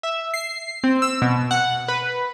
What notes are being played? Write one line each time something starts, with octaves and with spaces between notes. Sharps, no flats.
E5
C7
C4
E6
B2
F#5
B4